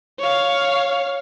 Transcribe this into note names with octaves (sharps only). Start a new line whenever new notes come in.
C#5 F5